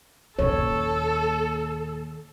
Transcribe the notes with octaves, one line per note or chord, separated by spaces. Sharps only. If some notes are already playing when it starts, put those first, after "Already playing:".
D#2 A#2 A4 C#5